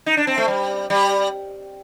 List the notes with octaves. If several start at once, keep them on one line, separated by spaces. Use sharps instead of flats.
D#4
D4
C4
A3
G3
G3